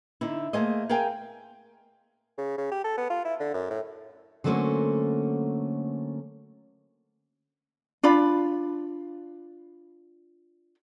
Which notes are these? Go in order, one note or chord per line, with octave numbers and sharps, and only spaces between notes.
D3 D#4 E4
A3 A#3 G#4 C5 D#5
G#4 A#4 F5 G5 G#5
C#3
C#3
G4
A4
B3
F4
E4
D3
F#2
A2
D3 F#3 A3 A#3 C#4 C5
D4 F4 D5 B5